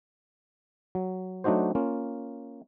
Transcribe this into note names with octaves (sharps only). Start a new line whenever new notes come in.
F#3
F#3 A3 D4 D#4 F#4 C5
A#3 C#4 F4